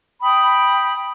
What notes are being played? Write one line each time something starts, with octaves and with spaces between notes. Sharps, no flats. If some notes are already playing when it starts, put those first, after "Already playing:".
G5 B5 D#6